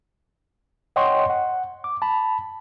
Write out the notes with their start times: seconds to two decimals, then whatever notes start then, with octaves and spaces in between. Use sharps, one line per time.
0.96 C#5 D#5 F#5 G5 C6 C#6
1.30 F#5
1.84 D6
2.02 A5 B5